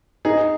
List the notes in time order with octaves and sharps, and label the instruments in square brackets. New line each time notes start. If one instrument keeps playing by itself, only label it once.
[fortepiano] D#4 [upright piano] G#4